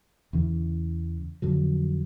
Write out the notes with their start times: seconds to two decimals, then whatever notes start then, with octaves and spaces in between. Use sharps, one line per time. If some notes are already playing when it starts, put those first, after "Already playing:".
0.33 E2 C#3 E3
1.42 F2 D3 F#3